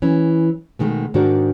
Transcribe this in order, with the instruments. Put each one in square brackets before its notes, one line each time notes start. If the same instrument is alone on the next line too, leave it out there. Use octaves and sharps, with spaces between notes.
[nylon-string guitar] E3 C#4
B2 D#3 G#3 A3
G#2 D#3 D4 F#4 A#4 D5